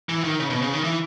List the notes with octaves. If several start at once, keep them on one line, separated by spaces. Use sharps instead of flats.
E3
D#3
C#3
B2
C#3
D#3
E3